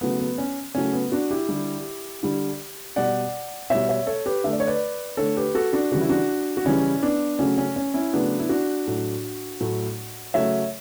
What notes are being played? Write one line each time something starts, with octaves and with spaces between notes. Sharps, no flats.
C#3 F#3 A3 B3
B3
C#4
C#3 F#3 A3 C#4
B3
D4 F#4
E4 G4
D3 G3
D3 G3
B2 G3 D5 F#5
B2 G3 C#5 E5
C#5 E5
A4 C#5
G4 B4
D3 A3 E5
D5
C#5
B4 D5
D3 A3 A4 C#5
G4 B4
F#4 A4
D4 F#4
C#3 E3 G3 F#4
E4
D4 F#4
F#4
C#3 E3 G3 C#4 E4
B3 D4
C#3 F#3 A3 C#4
C#4
C#4
C#4 E4
C#3 F#3 A3 B3 D4
E4
D4 F#4
A2 F#3 A3
A2 F#3 A3
C#3 F#3 A3 C#5 E5